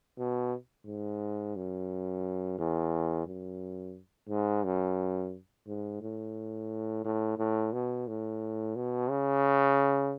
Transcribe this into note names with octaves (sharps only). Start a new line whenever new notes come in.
B2
G#2
F#2
E2
F#2
G#2
F#2
G#2
A2
A2
A2
B2
A2
B2
C#3